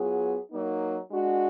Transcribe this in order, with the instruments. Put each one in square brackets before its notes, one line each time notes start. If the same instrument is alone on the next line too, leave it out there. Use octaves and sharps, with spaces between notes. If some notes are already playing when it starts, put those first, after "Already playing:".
Already playing: [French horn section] F#3 B3 F4 G#4
F#3 A#3 D#4
G#3 D4 F#4